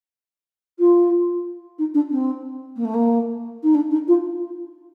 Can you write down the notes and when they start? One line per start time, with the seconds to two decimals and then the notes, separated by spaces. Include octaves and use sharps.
0.79 F4
1.78 D#4
1.94 D4
2.10 C4
2.76 A#3
2.84 A3
2.93 A#3
3.63 D#4
3.74 D4
3.90 D#4
4.07 F4